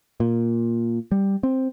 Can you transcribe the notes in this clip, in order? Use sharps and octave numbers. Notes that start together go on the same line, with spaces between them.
A#2
G3
C4